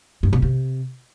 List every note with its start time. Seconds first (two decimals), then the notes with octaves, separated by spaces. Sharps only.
0.23 G2
0.33 B2
0.42 C3